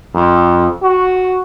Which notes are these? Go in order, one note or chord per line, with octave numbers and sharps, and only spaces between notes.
F2
F#4